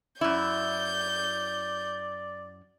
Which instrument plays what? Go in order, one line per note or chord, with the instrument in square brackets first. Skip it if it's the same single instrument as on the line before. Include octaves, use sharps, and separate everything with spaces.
[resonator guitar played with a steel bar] F#2 E4 [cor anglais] D5 [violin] G6